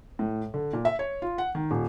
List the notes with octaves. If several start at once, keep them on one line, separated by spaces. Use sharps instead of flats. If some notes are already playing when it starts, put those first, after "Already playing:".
A2
D3
A#2
E5
C#5
F4
F#5
D#3
D#1